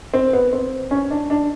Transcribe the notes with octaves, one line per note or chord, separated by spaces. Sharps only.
C4
B3
C4
C#4
D4
D4